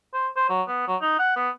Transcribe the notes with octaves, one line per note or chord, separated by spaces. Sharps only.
C5
C5
F#3
B3
F#3
D#4
F#5
B3